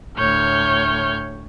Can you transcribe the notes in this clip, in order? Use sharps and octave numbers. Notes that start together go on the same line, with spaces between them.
D2 A2 C#5 F6 G6